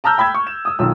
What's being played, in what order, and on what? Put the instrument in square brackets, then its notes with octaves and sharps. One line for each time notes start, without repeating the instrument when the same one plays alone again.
[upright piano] A5 A#5 E6 F6 G6
G5 B5 E6 G#6
C#6
E7
D#6 E6
B1 D#3 F4 E6